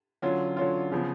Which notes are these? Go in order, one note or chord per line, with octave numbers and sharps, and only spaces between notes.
D3 F#3 C#4 F4
D3 F#3 C#4 F4
C#3 F3 B3